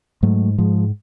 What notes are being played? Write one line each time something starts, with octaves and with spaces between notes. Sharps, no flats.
G#2 F#3 A3
G#2 F3 G#3